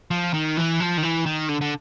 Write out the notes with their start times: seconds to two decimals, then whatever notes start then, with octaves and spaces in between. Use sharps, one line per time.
0.11 F3
0.34 D#3
0.57 E3
0.80 F3
0.98 D#3
1.03 E3
1.26 D#3
1.49 D3
1.61 D3